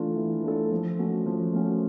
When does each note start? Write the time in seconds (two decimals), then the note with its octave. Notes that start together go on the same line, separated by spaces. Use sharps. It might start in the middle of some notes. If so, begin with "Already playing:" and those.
Already playing: E3 A3 D4 F4 A4
0.16 E3
0.43 A3 D4 F4 A4
0.71 F3
0.99 A3 C#4 F#4
1.26 F3
1.53 A3 C#4 F#4